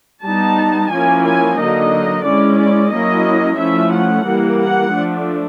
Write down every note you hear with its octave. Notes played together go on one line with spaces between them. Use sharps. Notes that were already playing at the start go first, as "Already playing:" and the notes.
G3 B3 D#4 A5
F3 A#3 C#4 E4 G#5
G#5
D3 F#3 A#3 D#4 D#5
G#3 C#4 E4 D5
D5
F#3 A#3 C#4 E4 D#5
F3 A3 C#4 E4 E5
F#5
E3 G3 A#3
F#5
F3 A3 D4